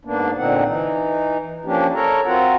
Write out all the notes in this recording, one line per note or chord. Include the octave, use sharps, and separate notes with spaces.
G#2 A#3 B3 D4
A#2 D3 C4 D#4 F#5
E3 D#4
F3 A#3 C#4 D4 G4
A4 A#4 C#5 A#5
C4 F4 F#4 F#5 A#5